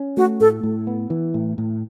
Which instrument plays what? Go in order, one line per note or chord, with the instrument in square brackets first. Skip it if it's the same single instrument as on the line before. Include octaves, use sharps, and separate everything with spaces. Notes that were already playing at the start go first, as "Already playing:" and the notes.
Already playing: [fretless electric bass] C#4
[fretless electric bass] A3 [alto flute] F#4
[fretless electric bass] A2 [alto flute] A4
[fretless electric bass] A2
B3
E3
A2
A2